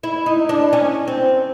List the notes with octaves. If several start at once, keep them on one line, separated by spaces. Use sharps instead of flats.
E4
D#4
D4
C#4
C4